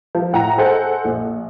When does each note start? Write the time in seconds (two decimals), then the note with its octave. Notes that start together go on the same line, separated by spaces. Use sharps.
0.15 F3
0.33 A2 F#5 G5 A#5 A#6
0.58 G#4 A4 C5 D#5 F#5
1.05 A#1